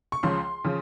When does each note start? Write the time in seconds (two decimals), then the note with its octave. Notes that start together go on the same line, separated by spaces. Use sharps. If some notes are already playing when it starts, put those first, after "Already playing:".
0.12 C#6
0.23 C#2 C#3 F3 C6
0.64 C#3 F3